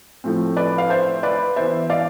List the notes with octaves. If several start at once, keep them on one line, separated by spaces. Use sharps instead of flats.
A2 F3 A3 C4
B4 D5
F5
C5 E5
B4 D5
E3 B3 C5 E5
D5 F5